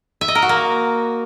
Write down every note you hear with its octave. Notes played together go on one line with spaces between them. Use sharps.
E5
D#5
A#4
F#4
A#3